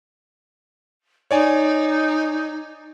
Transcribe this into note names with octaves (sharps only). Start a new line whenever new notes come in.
D#4 C#5 D5 G#5